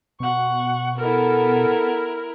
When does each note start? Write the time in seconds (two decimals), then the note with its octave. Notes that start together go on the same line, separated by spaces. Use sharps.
0.20 B2 F#5 C#6
0.98 B3 E4 A4 A#4